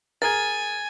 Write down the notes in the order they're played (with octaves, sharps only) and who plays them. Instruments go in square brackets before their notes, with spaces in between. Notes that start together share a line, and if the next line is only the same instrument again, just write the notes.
[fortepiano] G#4 A#4 [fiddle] G#5 [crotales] G#6 A6